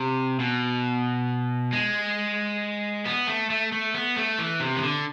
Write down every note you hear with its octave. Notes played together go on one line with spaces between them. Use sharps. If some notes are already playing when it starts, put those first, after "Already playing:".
Already playing: C3
B2
G#3
B3
A3
A3
A3
B3
A3
E3
C3
E3
D3